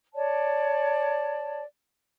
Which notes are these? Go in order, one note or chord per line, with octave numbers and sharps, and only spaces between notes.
C#5 D5 A5